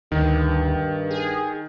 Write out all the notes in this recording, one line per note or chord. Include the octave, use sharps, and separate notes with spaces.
D2 G2 D#3
G#4